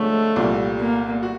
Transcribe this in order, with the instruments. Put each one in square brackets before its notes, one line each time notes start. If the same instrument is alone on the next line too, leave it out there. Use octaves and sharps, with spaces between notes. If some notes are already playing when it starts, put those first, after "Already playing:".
Already playing: [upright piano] D3 F3 G#3 C#4 [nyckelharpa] A3
[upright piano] C2 A#2 G3
[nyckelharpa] A#3
[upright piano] F#4